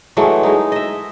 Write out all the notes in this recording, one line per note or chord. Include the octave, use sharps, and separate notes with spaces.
E3 F#3 G#3 A3
G#3 D#4
D#5 E5